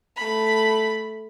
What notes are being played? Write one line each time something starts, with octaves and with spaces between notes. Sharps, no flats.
A3 B5